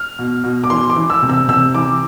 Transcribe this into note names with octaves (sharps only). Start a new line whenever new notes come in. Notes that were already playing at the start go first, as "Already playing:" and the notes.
Already playing: F6
B2
B2
D6
E3 C6
D6
E3
E6
C3
E6
C3 E6
E3 D6